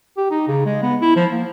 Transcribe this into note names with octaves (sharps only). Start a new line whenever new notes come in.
G4
D#4
C#3
G#3
B3
E4
F3
A#3